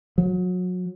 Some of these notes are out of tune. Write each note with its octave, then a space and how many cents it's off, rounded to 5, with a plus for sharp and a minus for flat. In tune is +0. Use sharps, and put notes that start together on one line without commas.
F#3 -30